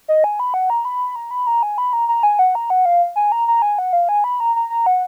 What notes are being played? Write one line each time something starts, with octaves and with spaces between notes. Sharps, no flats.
D#5
G#5
B5
F#5
A#5
B5
A#5
B5
A#5
G#5
B5
A#5
A#5
G#5
F#5
A#5
F#5
F5
G#5
A#5
A#5
G#5
F#5
F5
G#5
B5
A#5
A#5
A#5
F#5